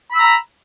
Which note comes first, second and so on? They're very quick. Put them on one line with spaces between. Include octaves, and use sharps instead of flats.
B5 E6 A#5